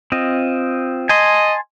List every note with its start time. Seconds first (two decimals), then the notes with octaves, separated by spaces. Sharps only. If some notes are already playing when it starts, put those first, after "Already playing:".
0.12 C4 F4 D#5
1.09 D#5 G#5 A5 C6